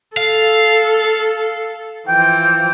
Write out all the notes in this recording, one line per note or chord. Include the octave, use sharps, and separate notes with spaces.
A4 F5
E3 F3 G5